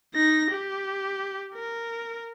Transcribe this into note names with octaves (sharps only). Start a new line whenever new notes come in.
D#4 A#6
G4
A#4